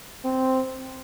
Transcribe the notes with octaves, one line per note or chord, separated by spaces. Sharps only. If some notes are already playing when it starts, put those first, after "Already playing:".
C4